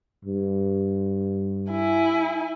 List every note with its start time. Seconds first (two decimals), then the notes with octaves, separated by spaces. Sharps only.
0.25 G2
1.71 E4 G#5